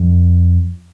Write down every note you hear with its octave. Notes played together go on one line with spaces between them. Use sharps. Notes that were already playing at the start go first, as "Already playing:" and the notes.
Already playing: F2